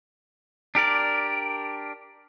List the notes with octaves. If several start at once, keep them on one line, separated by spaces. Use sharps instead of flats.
D4 G4 A#4 D5